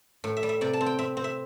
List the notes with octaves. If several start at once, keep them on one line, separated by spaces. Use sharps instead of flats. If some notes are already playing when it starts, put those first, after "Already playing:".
A2
E5
G3
E5
C3 D5
A5
C4
G5
C4 E5
C4
E5